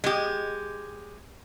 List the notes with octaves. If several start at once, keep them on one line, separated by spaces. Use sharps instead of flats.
G#3 G4